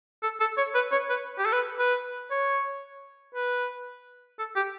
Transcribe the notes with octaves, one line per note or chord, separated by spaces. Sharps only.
A4
A4
C#5
B4
C#5
B4
G4
A4
B4
B4
C#5
B4
A4
G4